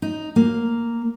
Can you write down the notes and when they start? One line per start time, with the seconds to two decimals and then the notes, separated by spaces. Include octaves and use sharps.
0.02 D#4
0.36 A#3